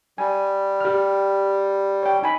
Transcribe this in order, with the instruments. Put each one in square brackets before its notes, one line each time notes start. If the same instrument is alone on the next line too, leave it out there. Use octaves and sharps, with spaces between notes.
[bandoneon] G3 [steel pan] G#5
[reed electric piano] G4 F6
[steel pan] C#5 G5
D#4 G#5 B5